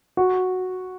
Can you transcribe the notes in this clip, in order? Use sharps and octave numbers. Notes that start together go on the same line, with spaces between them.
F#4